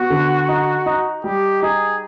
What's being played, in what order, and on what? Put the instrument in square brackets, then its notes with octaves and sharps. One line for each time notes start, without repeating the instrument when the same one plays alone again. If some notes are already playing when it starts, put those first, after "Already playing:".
Already playing: [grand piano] B3 [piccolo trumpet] F#4
[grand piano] D3
D#4
D#4
[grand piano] G3 [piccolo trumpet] G4
[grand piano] D#4 [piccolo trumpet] G#4